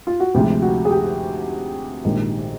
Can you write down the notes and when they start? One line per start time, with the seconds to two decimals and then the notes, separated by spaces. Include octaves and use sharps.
0.07 F4
0.20 F#4
0.34 D2 C3 F3 G#3 G4
0.62 F#4
0.85 G#4
0.91 G4
2.05 A#1 G#2 D#3